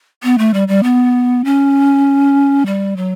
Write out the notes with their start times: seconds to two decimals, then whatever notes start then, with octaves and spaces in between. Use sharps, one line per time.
0.23 B3
0.38 A3
0.54 G3
0.68 G3
0.83 B3
1.45 C#4
2.66 G3
2.97 F#3